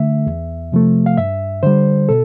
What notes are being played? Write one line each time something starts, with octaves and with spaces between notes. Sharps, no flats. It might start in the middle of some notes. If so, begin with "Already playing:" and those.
Already playing: D3 A3 E5
E2
C3 F3 A3
F5
G2 E5
D3 G3 C5
B2 A4